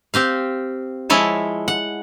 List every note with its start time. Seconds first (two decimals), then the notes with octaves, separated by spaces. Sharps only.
0.14 C4 G4 F5
1.10 F3 G#3 E4 C#5 A5
1.68 F#5